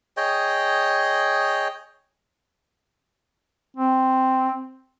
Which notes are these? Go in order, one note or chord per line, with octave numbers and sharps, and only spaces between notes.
G#4 C#5 D#5 G5
C4